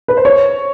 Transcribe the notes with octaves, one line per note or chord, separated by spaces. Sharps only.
B4
C5
C#5